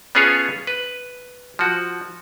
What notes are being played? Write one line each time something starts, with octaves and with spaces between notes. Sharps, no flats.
B3 C#4 F4 G#4 A4 C#5
B4
F3 F#4